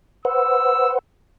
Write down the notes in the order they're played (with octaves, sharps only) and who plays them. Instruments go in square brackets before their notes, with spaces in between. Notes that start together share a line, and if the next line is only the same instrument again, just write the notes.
[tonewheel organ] B4 C5 F#5 [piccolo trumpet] E6